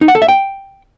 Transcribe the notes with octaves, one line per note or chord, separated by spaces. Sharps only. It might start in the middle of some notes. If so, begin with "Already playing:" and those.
D#4
F#5
A4
E5
G5